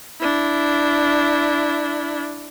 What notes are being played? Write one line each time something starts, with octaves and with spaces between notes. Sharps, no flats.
D4 E4